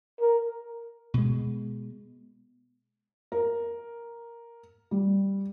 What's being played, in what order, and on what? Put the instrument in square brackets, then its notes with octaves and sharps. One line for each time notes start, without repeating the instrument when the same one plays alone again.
[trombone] A#4
[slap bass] B2 G#3
[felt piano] A#4
G3